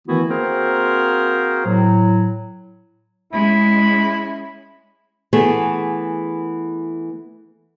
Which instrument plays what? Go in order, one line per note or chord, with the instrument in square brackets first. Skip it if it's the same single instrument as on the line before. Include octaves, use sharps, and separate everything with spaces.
[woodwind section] D#3 E3 A3 B3 E4 F#4
A#3 C4 F#4 G#4 A#4 C5
A2 F#3
[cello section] G#3 C#4 [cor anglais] E4
[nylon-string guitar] E3 A3 B3 G#4